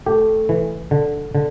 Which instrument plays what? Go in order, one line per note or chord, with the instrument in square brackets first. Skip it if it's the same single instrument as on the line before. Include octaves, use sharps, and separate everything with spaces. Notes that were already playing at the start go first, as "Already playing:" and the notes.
[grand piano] A3 A4 [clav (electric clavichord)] G4
[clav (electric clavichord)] E3
D3
D3